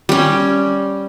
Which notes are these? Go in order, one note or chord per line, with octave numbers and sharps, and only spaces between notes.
G3 C#4